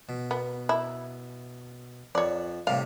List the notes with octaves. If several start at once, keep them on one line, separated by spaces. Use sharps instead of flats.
B2
B3
E4
F2 C#5 D5
A2 C3 G3 F5